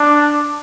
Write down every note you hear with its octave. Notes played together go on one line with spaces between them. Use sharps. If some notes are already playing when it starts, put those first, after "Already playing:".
Already playing: D4